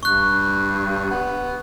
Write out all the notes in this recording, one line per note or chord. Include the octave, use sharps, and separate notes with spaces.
G2 C#6 F#6
B3